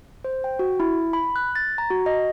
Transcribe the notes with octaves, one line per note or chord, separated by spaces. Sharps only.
C5
G5
F#4
E4
B5
F#6
A6
A#5
F#4
D#5